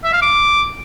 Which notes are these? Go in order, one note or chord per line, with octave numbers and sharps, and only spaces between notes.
E5
F5
D6